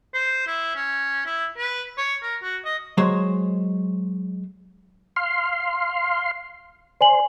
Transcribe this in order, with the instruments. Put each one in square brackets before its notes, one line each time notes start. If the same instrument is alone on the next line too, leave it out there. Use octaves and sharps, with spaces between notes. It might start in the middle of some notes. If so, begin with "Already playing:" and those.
[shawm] C5
E4
C#4
E4
B4
C#5
A#4
F#4
D#5
[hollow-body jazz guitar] F#3 G#3 C5 C#5
[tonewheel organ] F5 C6
[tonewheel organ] C5 [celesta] D5 G#5 F#7